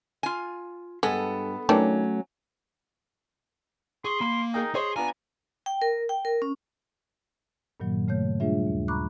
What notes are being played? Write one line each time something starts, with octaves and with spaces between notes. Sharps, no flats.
F4 G#5
G2 G#3 B3 A4
D#3 E3 F#3 A3 C#4 D4
G#4 C6 C#6
A#3 B5
D#4 G#4 A#4 G5
G#4 C5 C#5 D#5 C6
B3 D4 F4 G#5 A#5
G5
A#4
G5
A#4
C#4
G2 A#2 D#3 F#3 A#3
C#3 A3 C#5 G6
G3 A3 D4 F4 G#4 E5
D#2
A#5 B5 C#6 D6 F#6